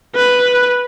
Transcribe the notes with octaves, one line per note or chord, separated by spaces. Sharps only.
B4